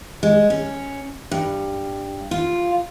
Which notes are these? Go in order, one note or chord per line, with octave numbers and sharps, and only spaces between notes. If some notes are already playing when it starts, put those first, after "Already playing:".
G#3
C#4
G2
F4